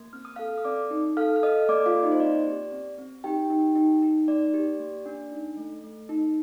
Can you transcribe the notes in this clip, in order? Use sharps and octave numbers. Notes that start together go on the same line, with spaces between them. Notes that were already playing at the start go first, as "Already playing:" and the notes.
Already playing: A#3
C4 F6
D#6
A4 F5 F6
D#6
C4 D5 D6
D#4
A4 F5 F6
F6
A4 D#5 D#6
A#3 D5 D6
F4 F5
A#3
D#4 D#5
C5
C4 D5
G4
C4
C4
D#4 G4 G5
D#4
D#4
D#4
A#3 D5
G4
A#3
D4
D#4
A3
A3
D#4